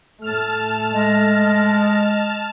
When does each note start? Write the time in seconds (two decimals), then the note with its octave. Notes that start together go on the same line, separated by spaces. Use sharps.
0.22 A2 A3 A5 F6
0.93 G#3 D#5